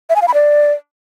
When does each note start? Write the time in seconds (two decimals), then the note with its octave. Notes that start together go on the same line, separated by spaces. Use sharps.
0.10 E5
0.16 G#5
0.22 F5
0.28 B5
0.34 D5